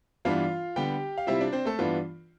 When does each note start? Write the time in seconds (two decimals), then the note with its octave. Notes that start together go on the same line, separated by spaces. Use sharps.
0.25 G2 E3 G3 B3 D4 F4 F5
0.76 D3 G3 B3 G4 G5
1.18 F5
1.27 C3 G3 C4 E4 F4 E5
1.41 D4 D5
1.53 C4 C5
1.65 A3 A4
1.79 G2 E3 B3 D4 F4